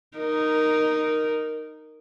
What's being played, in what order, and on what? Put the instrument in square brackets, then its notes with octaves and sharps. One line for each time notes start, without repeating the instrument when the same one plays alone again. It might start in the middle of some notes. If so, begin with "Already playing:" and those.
[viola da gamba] D#4 A#4